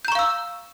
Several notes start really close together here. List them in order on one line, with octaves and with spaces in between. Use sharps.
G6 A#5 C#6 F5 E6